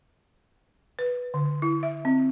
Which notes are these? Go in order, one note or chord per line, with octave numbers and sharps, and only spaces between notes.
B4
D3
E4
E5
C4